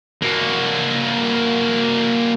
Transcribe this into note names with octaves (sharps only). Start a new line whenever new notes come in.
A#3 F#4